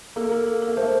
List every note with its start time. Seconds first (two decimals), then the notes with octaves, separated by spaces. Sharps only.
0.16 A#3 A4
0.32 A4
0.47 A4
0.62 A#3 A4
0.77 A3 C5